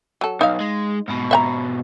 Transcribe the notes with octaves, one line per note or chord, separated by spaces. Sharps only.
F#3 A4
B1 D#4 F5
G#3
G#2 B2
E5 F#5 A#5